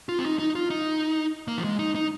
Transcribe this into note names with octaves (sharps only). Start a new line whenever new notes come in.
F4
C4
D#4
D#4
F4
D#4
A#3
F3
G#3
D#4
D#4